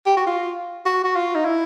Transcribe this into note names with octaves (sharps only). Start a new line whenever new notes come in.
G4
F#4
F4
F#4
F#4
F4
D#4
E4